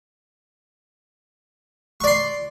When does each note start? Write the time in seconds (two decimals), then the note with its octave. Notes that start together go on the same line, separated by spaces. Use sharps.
2.01 C#6
2.04 D5
2.07 C6